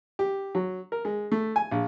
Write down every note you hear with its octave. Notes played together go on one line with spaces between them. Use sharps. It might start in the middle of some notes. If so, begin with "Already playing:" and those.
G4
F#3
A#4
G#3
A3
G#5
A#1